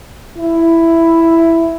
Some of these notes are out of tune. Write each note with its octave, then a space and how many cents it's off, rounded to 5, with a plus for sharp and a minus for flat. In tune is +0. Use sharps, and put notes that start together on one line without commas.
E4 +5